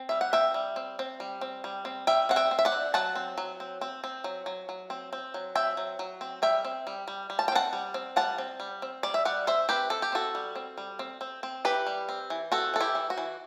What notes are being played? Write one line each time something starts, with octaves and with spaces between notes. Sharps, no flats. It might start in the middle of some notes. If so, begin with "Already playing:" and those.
Already playing: C4
G3 E5
F#5
C4 E5 G5
G3
C4
C4
G3
C4
G3
C4
G3 E5 G5
C4 F#5
E5 G5
C4
E5
D5 F#5
C4
F#3 F#5 A5
C4
F#3
C4
C4
C4
F#3
F#3
F#3
C4
C4
F#3
C4 E5 G5
F#3
F#3
C4
G3 E5 G5
C4
G3
G3
G3
A5
G5
C4 F#5 A5
G3
C4
G3 F#5 A5
C4
G3
C4
G3 D5
E5
G3 D5 F#5
C4 C5 E5
C4 G4 B4
C4 A4
G4
C4 F#4 A4
G3
C4
G3
C4
C4
C4
E3 G4 B4
G3
C4
E3
C4 F#4 A4
E3 A4
E4 G4
E3
F#4
E3